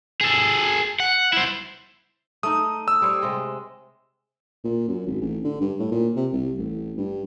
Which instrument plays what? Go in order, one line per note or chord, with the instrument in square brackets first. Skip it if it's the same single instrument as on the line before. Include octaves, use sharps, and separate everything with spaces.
[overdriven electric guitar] G#4 A4
F#5
E4 C5
[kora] A3 D#4 [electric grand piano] D#6
[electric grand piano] E6
[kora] G3 C4 C#5
C3 G#3 D#5
[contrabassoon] A#2
F#2
G#1
A1
D3
G2
A2
A#2
C3
C2
A1
G2